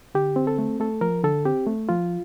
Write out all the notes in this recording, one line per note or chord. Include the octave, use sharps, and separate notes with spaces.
D3 G4
C4
A4
A3
A3 A4
F3 A#4
D3 A4
C4 G4
A3
F3 F4